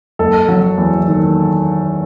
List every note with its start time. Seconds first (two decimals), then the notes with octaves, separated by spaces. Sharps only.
0.19 F#1 A4
0.49 F#3
0.77 E2
1.08 D#3